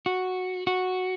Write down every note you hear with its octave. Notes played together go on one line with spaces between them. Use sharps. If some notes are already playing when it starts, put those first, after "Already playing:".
F#4
F#4